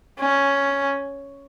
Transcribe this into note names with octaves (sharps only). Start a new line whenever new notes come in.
C#4